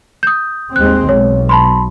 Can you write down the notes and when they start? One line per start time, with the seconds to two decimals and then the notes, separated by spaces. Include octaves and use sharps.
0.23 D#6 G6
0.76 D#2 G#3 C4 F#6
1.09 B1 C#5
1.49 A5 B5 C6